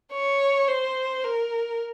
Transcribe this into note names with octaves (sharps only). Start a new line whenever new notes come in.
C#5
C5
A#4